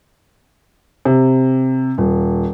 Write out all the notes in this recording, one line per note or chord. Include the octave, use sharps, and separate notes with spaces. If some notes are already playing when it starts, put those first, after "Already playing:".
C3
D#1